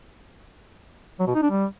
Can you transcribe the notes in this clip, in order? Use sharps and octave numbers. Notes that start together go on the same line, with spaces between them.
F#3
B2
D#4
D4
G3